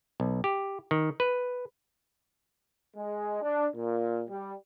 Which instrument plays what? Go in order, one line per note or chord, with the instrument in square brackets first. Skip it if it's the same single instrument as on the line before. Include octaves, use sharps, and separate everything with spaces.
[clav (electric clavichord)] B1
G4
D#3
B4
[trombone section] G#3
D4
A#2
G3